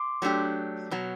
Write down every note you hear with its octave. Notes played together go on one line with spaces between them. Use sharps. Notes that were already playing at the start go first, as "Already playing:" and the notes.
Already playing: C6 D6
F#3 A3 D4 G4
B2 F#3